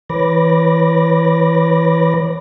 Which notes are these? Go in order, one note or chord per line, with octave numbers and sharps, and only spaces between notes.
E3 B4 C#5 B5 D6 A#6